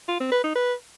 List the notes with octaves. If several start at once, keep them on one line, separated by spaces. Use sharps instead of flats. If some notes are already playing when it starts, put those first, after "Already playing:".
F4
C4
B4
D#4
B4